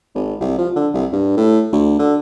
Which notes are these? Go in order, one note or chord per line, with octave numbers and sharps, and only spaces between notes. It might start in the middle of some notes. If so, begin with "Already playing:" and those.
G#1
C2
F3
D3
C2
G2
A2
D2
D3